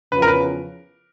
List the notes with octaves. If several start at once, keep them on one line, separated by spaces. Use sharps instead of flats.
E2 C#3 F3 B4
A#4
B4